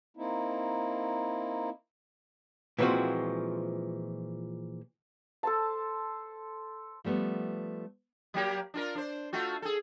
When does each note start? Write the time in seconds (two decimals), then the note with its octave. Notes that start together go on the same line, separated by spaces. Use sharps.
0.17 A#3 C4 D#4 E4
2.79 A#2 E3 F3 G#3 C4 F#4
5.43 A4 C5 A5
7.04 F3 G3 A3 B3
8.34 F#3 A#3 G4
8.74 D4 F4 A#4
8.95 D4 C5
9.33 A3 F4 F#4
9.62 G#4 A4